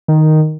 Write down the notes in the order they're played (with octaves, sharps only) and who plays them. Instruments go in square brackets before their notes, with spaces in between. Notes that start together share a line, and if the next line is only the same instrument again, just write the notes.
[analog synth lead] D#3